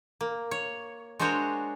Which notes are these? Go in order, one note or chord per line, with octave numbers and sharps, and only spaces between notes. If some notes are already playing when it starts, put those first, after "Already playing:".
A#3
C#5
G#3 D4 F#4 A#4 C5 C#5